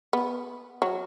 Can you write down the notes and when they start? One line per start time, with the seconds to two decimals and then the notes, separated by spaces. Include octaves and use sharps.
0.13 B3
0.82 F#3